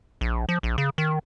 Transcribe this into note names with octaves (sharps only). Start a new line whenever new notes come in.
A#1
F3
A#1
C#3
D#3